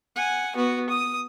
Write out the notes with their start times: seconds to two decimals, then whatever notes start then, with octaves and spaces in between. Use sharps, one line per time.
0.16 F#5 G#5
0.56 B3 F#4
0.89 D#6